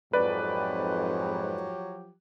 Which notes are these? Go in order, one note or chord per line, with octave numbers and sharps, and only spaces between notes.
F2 G#2 F3 F#3 G4 B4 D5